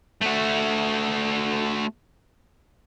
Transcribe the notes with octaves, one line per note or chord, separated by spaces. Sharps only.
A3 F#4